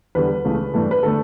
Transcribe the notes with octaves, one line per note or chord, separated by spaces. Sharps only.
E2 D3 G3 B4
C#2 C#3 E3 A3
G2 E3 A3
B4
D3 A3 A4